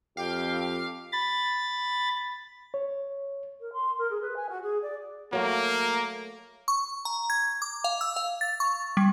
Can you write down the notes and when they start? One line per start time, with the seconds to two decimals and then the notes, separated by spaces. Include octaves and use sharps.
0.17 F2 G4 F5 G5
1.13 B5 A6
2.74 C#5
3.59 A#4
3.73 C6
3.98 A#4
4.10 G#4
4.22 B4
4.36 G#5
4.49 F#4
4.62 G#4
4.82 D5
5.33 F#3 A3 A#3
6.68 C#6
7.05 A#5
7.30 G#6
7.62 D6
7.84 F5
8.01 E6
8.16 F5
8.41 A6
8.60 C#6
8.97 G3